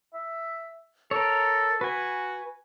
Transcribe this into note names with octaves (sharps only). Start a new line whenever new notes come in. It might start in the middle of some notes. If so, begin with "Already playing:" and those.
E5
A4 A#4 C#5
F#4 B4 G#5